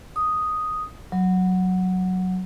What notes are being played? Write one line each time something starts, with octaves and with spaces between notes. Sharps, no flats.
D#6
F#3